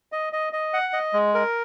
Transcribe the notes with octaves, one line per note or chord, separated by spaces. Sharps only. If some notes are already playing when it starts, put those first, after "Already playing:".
D#5
D#5
D#5
F#5
D#5
G#3
A#4